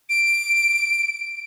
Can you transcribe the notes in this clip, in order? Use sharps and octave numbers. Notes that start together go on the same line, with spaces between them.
D7